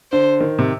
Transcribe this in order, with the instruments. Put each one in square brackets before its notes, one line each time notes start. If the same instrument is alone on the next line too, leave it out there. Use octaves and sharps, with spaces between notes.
[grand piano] D3 [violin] C5
[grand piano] D#3
C3